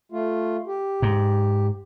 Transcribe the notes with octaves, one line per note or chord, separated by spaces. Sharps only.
A3 F4
G4
G#2